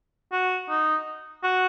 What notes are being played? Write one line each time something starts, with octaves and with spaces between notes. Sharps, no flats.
F#4
D#4
F#4